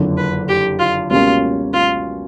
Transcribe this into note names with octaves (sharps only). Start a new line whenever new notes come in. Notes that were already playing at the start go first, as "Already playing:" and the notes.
Already playing: F#1 F2 D3
B4
G4
F4
C#2 B2 G3 A#3 C#4 F4
F4